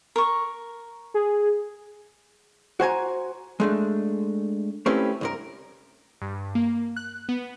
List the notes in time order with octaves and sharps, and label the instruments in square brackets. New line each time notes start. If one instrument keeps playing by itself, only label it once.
[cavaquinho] A#4 C#6
[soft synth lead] G#4
[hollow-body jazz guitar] F#4 C5 G#5 A#5
G#3 A3 D4
A3 C4 C#4 E4 G4 B4
C2 G2 A#4
[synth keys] G2
A#3
F#6
B3